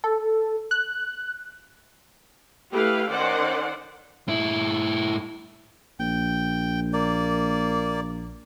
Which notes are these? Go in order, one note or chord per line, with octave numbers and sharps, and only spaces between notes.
A4
F#6
A3 E4 G4 B4 F5
D#3 C#4 C5 D5 F#5
G#2 E4
A#1 G5
A#3 D5